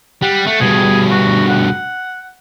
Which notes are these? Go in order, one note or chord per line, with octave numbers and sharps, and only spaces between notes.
G3 F#5
A3
G2 B2 G#4
F#4
F#5